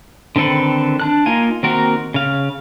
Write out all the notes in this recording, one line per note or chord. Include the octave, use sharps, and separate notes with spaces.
D3 D#3 C4 A4 B4
D4 A5 F#6
A#3 D#4 F4 G#5
D#3 A#3 C4 F#4 A#4
C#3 F5